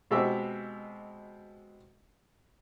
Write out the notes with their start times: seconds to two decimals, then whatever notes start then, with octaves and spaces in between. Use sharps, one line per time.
0.11 B2 G#3 C4 G4 E5